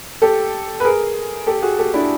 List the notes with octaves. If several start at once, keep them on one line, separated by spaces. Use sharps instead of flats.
G4 A4
B4
G#4 A#4
G4 A4
F#4 G#4
G4 A4
D4 E4